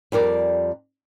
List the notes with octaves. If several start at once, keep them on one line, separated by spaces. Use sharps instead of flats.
F2 G3 A#4 D5